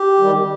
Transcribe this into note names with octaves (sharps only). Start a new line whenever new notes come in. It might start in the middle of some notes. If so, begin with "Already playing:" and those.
Already playing: G4
D#3 G3